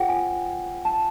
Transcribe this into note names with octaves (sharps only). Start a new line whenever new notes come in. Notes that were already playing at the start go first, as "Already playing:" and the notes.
Already playing: F4 G#4 C5 F#5 G5
G#5
A5